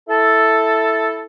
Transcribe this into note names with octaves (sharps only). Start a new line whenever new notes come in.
E4 A4